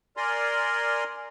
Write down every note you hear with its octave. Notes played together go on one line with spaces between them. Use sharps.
A#4 D5 G#5 A#5 C6